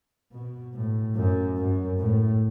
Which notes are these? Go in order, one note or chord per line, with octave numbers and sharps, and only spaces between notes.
B2
A2
F#2
F#2
A2